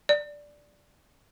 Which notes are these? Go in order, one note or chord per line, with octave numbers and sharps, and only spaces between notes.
D5